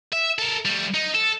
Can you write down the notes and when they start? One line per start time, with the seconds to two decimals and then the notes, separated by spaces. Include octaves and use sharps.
0.13 E5
0.38 A4 A#4
0.65 G3 A3
0.94 D#4
1.15 A4